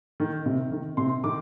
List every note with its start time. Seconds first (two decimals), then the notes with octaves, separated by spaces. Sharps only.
0.20 D#3
0.46 C3
0.72 D#3
0.97 C3 C6
1.24 D#3 D6